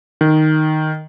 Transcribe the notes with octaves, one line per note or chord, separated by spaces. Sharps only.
D#3